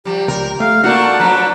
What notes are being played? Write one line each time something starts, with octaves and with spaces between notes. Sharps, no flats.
F3 G3 G4
C#2 A#4
A3 F5
A3 A#3 D4 D#4 F#4 D5 F#5
F3 F#3 D4 B4 A#5